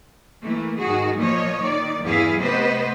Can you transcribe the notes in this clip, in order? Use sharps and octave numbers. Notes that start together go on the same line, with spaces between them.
E3 A3 A#3
G#2 D#3 F#4 G#4
A#2 F3 A#3 C#5 D#5
D#3 D5
E2 G2 E3 E4 G#4 F5
C3 A3 B3 B4 C5 D#5